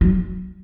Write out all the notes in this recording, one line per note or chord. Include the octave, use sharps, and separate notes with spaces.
F#3